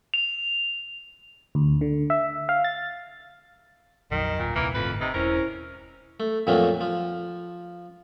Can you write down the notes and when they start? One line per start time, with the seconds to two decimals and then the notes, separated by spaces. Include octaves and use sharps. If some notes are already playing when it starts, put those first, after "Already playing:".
0.14 F7
1.55 D2
1.81 D3
2.10 E5
2.49 F5
2.64 A6
4.11 A#1 F2 D#3 F#3
4.39 D1 A#2
4.56 D#1 C2 C3 E3 A#3
4.75 G1 F2 A2 B4
5.01 C3 D#4
5.14 E1 C#4 E4 A#4 C5
6.20 A3
6.47 F2 A#2 F3 F#3 A3 A#3
6.81 F3